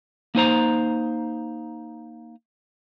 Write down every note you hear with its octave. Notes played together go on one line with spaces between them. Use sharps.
A#3 D#4 C5 A#5